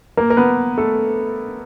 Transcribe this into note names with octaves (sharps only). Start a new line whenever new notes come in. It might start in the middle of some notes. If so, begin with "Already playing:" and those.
A#3 A#4
A#4
B3 B4
A3 A4